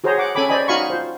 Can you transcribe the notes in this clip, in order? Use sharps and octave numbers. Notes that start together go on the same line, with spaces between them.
F#4 G#4 C5 C#5 A#5
F#5 D6
C#4 A4 G#5 B5 D6
C5 D5 D#5 G#5 B5
D#4 F#4 F5 G#5 B5 C#6
F4 C5